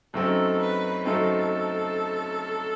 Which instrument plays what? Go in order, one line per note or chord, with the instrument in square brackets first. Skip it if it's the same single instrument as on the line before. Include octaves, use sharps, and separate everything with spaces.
[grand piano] F#2 F#3 A3 C4 D#4 [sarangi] A4
[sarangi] B4
[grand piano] F#2 F#3 A3 C4 D#4 [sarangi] A4